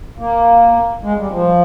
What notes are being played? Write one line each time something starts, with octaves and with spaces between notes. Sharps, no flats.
A#3
G#3
G3
F3